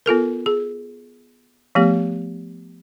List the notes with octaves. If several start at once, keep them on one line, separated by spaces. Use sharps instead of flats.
B3 F4 A4 A#4
G#4
F3 A3 B3 G4